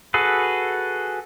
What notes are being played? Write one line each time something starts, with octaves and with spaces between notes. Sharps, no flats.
F#4 G#4 A4 B4